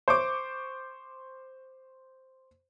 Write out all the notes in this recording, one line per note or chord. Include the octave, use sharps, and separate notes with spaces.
C5 C#6 D6